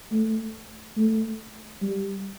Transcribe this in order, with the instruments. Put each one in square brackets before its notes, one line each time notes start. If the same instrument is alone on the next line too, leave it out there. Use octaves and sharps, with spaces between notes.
[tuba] A3
A3
G3